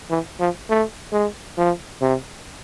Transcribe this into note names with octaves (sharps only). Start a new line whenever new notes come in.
E3
F3
A3
G#3
F3
C3